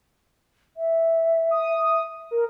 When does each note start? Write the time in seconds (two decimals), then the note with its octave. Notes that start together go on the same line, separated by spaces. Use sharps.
0.77 E5
1.51 D#6
2.31 A#4